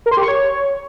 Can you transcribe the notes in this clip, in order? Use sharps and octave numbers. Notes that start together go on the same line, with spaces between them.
A#4
C6
G4
C#6
C#5